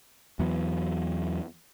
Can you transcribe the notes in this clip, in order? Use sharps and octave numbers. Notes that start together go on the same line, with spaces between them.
E2 E3 F#3 B3